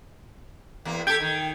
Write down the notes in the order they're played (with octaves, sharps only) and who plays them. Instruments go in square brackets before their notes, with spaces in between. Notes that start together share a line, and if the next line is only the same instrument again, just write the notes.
[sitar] E2 A#3
[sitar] G4 A4 [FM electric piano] G5 G#6
[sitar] D#3